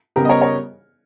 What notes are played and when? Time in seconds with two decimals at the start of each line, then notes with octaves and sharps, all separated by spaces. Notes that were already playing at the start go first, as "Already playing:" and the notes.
0.16 C#3 G3 B3 G4 A#4
0.25 D#5
0.29 A#4 C#5
0.41 A#4 C#5